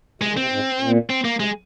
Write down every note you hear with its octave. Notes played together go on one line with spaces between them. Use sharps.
C3 G#3
D#2 D#3
C3 C4
G#2
A#2
C4
A#3
C3 G#3